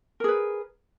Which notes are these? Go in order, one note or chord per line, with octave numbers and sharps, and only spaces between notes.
G#4 A#4 B4